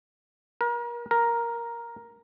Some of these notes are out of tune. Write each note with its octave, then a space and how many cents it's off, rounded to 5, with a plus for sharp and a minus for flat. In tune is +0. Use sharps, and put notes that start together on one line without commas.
A#4 +35
A#4 +5